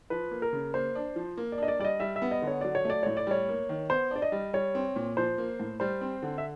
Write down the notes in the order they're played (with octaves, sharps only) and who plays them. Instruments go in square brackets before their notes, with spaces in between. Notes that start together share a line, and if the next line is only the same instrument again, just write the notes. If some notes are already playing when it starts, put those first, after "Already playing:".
[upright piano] F3 [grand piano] B4
[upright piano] A#3
[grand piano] A#4
[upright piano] C#3
[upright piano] A#3 [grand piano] C5
[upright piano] D4
F3
A#3
[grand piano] D5
[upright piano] D4 [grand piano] D#5
[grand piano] D5
[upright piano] G3 [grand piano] D5
[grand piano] D#5
[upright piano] G3 [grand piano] E5
[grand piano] E5
[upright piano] B3
[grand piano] D#5
[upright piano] D3
[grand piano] C#5
[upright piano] F#3 [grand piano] D5
[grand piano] C#5
[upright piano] A3 [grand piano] D5
[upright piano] A2 [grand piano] C#5
[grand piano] D5
[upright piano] G3 [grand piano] C#5
[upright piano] A#3
D#3
[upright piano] B3 [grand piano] C5
[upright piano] D4 [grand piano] D5
[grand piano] D#5
[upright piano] G3
[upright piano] G3 [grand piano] C#5
[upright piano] C4
A#2
[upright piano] F3 [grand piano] C5
[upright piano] A#3
A2
[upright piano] G3 [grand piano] C5
[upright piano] C4
D3
[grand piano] E5